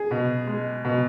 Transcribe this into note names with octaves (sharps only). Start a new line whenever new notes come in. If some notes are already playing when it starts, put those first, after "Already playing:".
Already playing: G#4
B2
G#3
B2